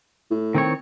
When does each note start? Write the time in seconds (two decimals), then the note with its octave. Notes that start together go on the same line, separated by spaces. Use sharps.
0.31 A2
0.55 D#3 C4 C#5